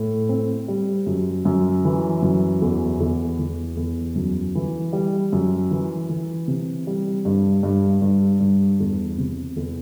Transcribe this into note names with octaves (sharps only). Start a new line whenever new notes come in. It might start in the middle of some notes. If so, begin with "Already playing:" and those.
Already playing: A2
C4
G3
F#2
F#2
E3
F#2
E2
E2
E2
E2
F#2
E3
G3
F#2
E3
E3
C3
G3
G2
G2
G2
G2
E2
C3
E2